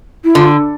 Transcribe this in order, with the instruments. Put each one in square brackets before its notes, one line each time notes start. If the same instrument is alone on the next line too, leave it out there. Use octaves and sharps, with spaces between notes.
[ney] E4
[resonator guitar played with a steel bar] D3 [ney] F4